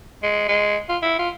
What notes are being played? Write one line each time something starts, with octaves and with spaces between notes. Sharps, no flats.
G#3
G#3
F4
E4
F4